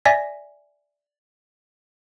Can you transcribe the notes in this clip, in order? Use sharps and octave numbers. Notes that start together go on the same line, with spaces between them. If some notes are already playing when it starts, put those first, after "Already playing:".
D5 E5 G#5 A#6 B6